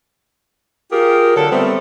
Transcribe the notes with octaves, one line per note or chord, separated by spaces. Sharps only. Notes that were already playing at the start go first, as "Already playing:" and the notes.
F4 G4 G#4 A#4
D3 F#3 A4
G3 A3 B3 C4 C5